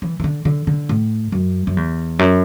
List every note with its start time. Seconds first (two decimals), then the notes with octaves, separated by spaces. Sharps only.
0.02 E3
0.20 E3
0.24 D3
0.45 D3
0.67 D3
0.89 A2
1.32 F#2
1.67 F#2
1.77 E2
2.19 F#2